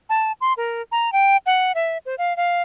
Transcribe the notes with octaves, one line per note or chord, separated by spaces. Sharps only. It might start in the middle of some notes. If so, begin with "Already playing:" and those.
A5
C6
A#4
A#5
G5
F#5
E5
C5
F5
F5